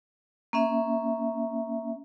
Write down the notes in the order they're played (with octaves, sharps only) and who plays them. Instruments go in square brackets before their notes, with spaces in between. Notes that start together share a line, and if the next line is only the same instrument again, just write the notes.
[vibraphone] A#3 C#4 E5